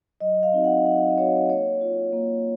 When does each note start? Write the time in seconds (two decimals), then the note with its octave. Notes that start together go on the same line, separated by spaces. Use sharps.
0.21 F#3 D#5
0.43 F5
0.53 C4 D#4 F#4
0.64 F#5
0.85 F#3 F#5
1.10 D#5
1.17 C4 D#4 F#4 C#5
1.50 A#3 C#5
1.81 F4
2.13 A#3